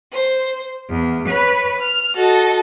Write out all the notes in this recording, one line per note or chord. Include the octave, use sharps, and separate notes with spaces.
C5
E2
B4 C#5
F6
F#4 A4 D#5